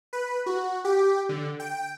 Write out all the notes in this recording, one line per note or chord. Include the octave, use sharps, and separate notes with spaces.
B4
F#4
G4
D3
G5